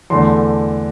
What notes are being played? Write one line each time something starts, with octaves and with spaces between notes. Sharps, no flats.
E2 D3 A3 C6